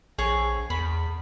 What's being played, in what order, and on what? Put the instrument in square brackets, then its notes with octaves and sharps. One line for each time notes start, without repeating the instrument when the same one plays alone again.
[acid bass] A#1 [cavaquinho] G#4 C#5
[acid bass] E2 [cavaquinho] B5